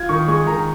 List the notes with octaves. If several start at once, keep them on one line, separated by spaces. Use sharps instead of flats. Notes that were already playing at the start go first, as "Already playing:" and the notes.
Already playing: F4 G#6
D#3 C#6
G#3 C#6
D#3 A#5